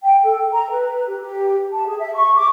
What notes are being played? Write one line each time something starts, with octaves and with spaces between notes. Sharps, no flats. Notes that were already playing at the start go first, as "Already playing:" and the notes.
G5
A4
A#5
B4
G4
G4
A5
G#4
E5
C#6
D6